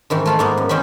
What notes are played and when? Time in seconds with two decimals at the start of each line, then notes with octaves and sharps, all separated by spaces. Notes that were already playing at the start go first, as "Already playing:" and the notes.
0.10 G#2 D#3 E3
0.26 A3 F4 B5
0.39 G#2 A#3 B3
0.57 F#2
0.69 E2 D#3 C#4 C5 B5